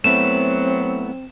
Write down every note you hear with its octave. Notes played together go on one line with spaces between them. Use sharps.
F#3 A3 B3 C4 E4 E7